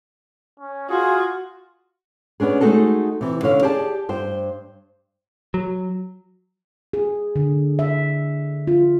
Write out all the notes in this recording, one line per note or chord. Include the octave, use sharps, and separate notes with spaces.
C#4
F4 F#4 G#4
B3 C#4 D4 G#4
G#3 A3 D#4 F#4 G#4 A4
C3 E3
D3 C#4 F5
G4 G#4 D5 A5
G2 C5 G5
F#3
G#4
D3
E5
F4